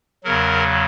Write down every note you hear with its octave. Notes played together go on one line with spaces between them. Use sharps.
E2 C#3 F#3 A#4